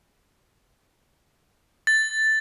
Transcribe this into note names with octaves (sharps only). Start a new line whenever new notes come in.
A6